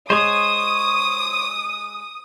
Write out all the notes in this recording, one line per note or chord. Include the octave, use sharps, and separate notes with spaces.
G#3 C5 C#5 D#6